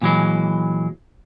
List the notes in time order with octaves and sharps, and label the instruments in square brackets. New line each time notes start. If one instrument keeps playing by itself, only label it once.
[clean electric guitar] A#2 E3 F#3 G#3